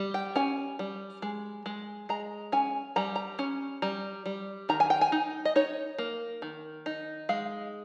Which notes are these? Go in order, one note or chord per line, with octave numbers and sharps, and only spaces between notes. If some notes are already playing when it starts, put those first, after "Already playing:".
Already playing: G3
G5
C#4 G#5
G3
G#3
G#3
G#3 A#5
C#4 G#5
G3 A#5
A#5
C#4
G3 A#5
G3
D#3 A#5
G#5
G5
G#5
D#4
D#5
D#4 C#5
A#3
D#3
D#4
G#3 F5